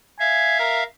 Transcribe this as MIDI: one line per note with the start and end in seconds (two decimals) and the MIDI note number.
0.20 0.83 76
0.20 0.83 77
0.20 0.55 80
0.60 0.81 70